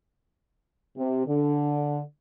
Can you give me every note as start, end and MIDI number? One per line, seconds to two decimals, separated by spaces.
0.96 1.23 48
1.27 2.00 50